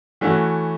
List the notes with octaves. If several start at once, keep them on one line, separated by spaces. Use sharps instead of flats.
E3 A3 C#4 F#4